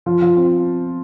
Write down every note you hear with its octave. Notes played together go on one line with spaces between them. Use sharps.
F3
F3
C4